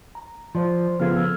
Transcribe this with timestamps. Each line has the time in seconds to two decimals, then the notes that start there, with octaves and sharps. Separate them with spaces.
0.15 A#5
0.55 F3 C5 D5 C6
1.00 C#3 F3 B3 F4 A4 F6 G#6
1.16 E6 F6